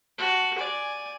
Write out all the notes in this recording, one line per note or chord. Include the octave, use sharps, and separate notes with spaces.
F#4 A5
D5 G#5